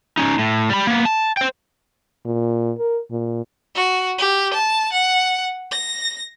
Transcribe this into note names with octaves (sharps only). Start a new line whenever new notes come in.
C#4 D#4
A2
G3 B5
A#3 B3
A5
C5 G5
A#2
A#4
A#2
F#4
G4
A5
F#5
A#6